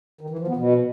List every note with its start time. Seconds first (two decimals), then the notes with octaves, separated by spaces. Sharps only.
0.21 D#3
0.30 E3
0.39 F3
0.47 B3
0.56 B2